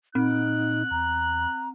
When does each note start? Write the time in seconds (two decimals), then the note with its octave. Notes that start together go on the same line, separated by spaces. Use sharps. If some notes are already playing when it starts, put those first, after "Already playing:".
0.15 A#2 C4 D#4 F#6
0.91 E2 A#5